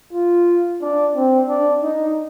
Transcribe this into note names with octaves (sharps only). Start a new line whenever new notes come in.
F4
D4
C4
D4
D#4